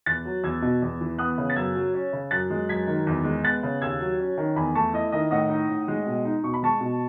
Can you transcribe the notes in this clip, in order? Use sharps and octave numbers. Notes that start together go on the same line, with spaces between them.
E2 F#6 A6
F#3
E2 E6 G#6
B2
E2
E3
B3 D#6 F#6
C#3
A6
F#2 E6 G#6
F#3
C#4
C#3
F#2 F#6 A6
G#3
F#2 G#6 B6
D#3
E2
G#3
B3 F#6 A6
C#3
D#2 E6 G#6
F#3
C#4
D#3
E2 G#5 B5
A3 A5 C#6
E4 D#5
D#3 D#5
A2 D#5 F#5
D#4
A2
G#3
B2
D#4
B2 C#6
B5
G#3 A5 C#6
B2